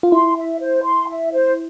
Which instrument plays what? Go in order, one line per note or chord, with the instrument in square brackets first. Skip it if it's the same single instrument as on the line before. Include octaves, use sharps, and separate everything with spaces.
[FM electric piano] F4
[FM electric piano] E4 [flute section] C6
[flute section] E5
C5
C6
E5
C5